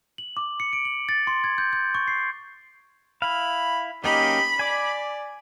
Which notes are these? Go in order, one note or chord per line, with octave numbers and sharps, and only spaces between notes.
F#7
D6
C#7
D7
F#7
A6
C6
G#6
G6
G6
C#6
C7
E4 F5 B5
F#3 A#3 C#4 D#4 G4 B5
D5 G#5 D6